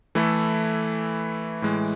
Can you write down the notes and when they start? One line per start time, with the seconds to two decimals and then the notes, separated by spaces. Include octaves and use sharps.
0.15 E3 A3 E4 A4
1.62 A2 E3 G#3